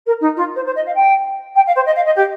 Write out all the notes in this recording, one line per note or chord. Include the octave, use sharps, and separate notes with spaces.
A#4
D#4
F4
C5
C5
D#5
F5
G5
G5
F5
C5
D#5
F5
D#5
G4